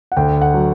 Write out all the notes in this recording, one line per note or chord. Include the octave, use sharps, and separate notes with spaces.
F#5
D2 G5
F#5
F#3